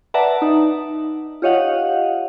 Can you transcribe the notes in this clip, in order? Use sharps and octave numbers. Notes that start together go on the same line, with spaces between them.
B4 D5 E5 F#5 A5 A#5
D#4
F4 G4 C#5 D#5 F5 F#5